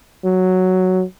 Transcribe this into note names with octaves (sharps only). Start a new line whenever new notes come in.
F#3